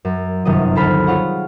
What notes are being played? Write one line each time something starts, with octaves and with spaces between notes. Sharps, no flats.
F#2
G1 F#2 C3 D#3 D#5
D2 A4 C5 B5 F6
F4 G#4 C#5 F#5